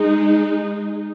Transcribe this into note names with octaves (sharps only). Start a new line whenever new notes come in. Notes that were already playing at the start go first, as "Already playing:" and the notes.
Already playing: G#3 D#4